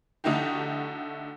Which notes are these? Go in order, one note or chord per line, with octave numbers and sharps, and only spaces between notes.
D3 A3 D#4 E4 F#4 G4